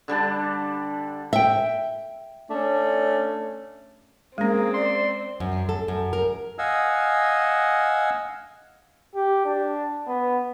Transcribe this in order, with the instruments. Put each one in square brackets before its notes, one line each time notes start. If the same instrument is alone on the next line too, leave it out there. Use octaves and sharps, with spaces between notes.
[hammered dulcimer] D3 G3 D4 A5
[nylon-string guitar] E5 G5
[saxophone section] A3 C#4 D4
[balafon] G#3 C#4 [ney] A#3 [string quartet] C4 [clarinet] G#4
[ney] D5 [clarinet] C6
[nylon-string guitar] F#2
A4
F#2
A#4
[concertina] D#5 F5 F#5 G#5 E6
[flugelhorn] G4
D4
B3